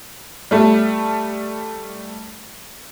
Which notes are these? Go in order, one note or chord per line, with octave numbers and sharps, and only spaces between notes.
G3 A3